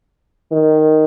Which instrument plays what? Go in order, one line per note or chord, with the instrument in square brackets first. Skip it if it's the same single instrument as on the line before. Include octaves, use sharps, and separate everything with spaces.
[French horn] D#3